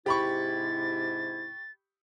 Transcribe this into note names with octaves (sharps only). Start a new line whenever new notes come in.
G#2 C3 E4 G4 B5 C#6 A6